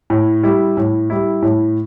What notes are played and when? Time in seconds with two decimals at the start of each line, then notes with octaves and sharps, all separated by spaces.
0.10 A2
0.43 G3 E4
0.77 A2
1.10 G3 E4
1.42 A2